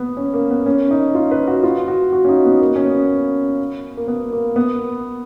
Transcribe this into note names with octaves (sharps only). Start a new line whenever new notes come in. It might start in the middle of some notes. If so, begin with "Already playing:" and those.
Already playing: B3
C#4
A#3
B3
C#4
D#4
F4
B4
F#4
F4
F#4
F#4
C#4
D#4
B3
A#3
C#4
B3
A#3
B3
A#3
B3